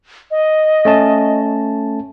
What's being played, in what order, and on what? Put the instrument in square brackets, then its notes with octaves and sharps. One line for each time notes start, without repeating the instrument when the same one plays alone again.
[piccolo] D#5
[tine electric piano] A3 C#4 A5